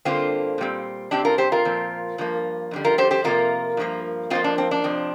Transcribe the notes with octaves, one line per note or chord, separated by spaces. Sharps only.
G2 D3 A#3 C4 F4
A#2 G3 C4
C3 G3 C4 D4 G4
F4 A#4
G4 C5
F4 A#4
A#2 F3 C4
G2 F3 A#3
F2 D3 G3
F4 A#4
G4 C5
G4 C5
F2 C3 A#3 F4 A#4
G2 F3 A#3
F2 F3 A#3 C4 F4
D4
C4
D4
F2 C3 F3 C4